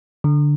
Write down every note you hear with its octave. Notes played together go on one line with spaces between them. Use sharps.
D3